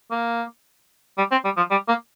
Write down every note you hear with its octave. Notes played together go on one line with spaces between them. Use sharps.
A#3
G3
C4
G3
F3
G3
A#3